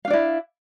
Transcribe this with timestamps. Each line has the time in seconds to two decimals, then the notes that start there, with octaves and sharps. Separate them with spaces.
0.05 F5
0.08 D4
0.10 D5
0.13 E4